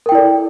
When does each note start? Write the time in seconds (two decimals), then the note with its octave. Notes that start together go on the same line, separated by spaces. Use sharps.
0.06 A#4
0.09 G5
0.12 E4
0.15 D5
0.18 A4